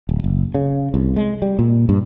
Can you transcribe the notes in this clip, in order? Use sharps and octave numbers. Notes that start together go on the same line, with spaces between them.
D1
F#1
C#3
C2
G#3
G3
A#2
G2